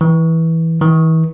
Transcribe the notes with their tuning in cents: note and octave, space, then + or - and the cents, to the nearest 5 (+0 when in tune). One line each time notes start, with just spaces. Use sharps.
E3 -15
E3 -40